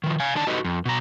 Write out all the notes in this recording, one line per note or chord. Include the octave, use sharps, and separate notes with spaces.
D#3 F3
F5 G#5
D3 D#3 D4 A5
D#4 F#4 G4 A4 B4 D#5
F2
B2 A#5